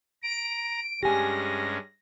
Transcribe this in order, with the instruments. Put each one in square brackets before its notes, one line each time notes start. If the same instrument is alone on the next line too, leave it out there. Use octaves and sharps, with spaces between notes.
[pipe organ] A#5 [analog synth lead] D7
[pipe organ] G2 G#3 C#4 [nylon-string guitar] G4 G#5 [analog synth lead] A#6